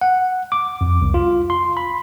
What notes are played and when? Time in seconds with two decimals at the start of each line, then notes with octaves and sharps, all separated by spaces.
0.01 F#5
0.52 D6
0.81 F2
1.02 C2
1.14 F4
1.50 C6
1.77 B5